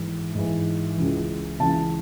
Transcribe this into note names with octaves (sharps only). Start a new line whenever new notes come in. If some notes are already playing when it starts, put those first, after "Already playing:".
Already playing: G#2 E3
G#2 E3
C#2 C#3 E3
C#2 C#3 E3 A5